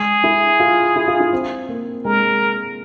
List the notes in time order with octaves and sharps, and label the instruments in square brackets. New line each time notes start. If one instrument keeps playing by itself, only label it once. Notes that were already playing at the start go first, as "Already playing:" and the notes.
Already playing: [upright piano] G#3 [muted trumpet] G#4
[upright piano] E4
F4
E4
F4
E4
C4
A#3
[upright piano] G#3 [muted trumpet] A#4